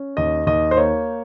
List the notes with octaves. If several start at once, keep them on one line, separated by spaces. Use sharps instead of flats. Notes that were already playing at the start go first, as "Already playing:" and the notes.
Already playing: C#4
D#2 D#5
D#2 D#5
C5
A#3 C#5